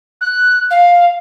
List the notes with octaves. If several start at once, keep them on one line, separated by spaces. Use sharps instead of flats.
F#6
F5